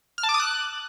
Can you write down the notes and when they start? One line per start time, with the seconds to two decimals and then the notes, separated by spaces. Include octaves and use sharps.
0.18 F6
0.23 A5
0.29 D6
0.34 D#6
0.40 F#6